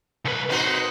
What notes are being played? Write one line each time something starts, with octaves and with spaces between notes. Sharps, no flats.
C2 B4
C4 D#4 F#4 B4 C5